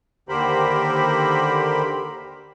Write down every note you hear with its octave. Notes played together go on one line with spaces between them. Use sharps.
D#2 D3 G4 A#4 C5 B5